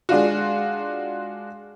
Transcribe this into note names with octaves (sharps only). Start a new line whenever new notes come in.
G#3 D4 F4 F#4